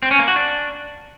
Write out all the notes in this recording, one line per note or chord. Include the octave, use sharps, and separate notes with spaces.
C4
C#4
A#3
F#4
D4